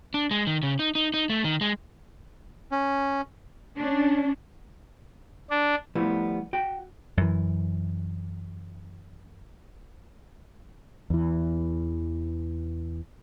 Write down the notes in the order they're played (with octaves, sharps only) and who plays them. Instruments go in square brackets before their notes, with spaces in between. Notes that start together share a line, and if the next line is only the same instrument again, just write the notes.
[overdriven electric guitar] D4
G#3
D#3
C#3
D#4
D#4
D#4
A3
D#3
G#3
[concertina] C#4
[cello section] C#4 D4
[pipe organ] D4
[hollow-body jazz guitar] F3 G3 A3 B3 E4
F#4 G5
[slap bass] F#2 E3
[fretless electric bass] E2 E3